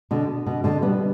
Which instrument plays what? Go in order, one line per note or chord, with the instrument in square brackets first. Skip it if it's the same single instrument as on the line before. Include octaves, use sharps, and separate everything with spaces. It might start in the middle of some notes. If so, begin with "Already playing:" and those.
[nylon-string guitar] B2 D3
B2
B2 D3
G3 B3